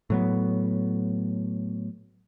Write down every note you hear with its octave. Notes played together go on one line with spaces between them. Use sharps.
A2 F#3 B3